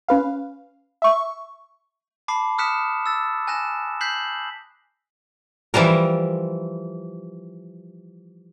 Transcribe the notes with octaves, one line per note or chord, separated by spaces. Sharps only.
C#4 B4 F5
E5 C#6
A5 B5 D6 C7
D#6 F6 F#6 B6 C#7 E7
E6 A6
G#5 F#6 A#6 E7
F#6 G6 B6 C7 F#7
E3 F3 G3 A#4